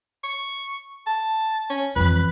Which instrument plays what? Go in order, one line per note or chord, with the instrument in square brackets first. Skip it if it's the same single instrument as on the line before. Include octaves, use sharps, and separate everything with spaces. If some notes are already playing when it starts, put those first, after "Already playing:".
[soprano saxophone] C#6
A5
C#4
[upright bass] F2 E3 [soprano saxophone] B4